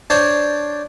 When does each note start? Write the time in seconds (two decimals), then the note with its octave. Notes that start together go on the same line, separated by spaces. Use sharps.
0.10 D4 C5 C#5 A5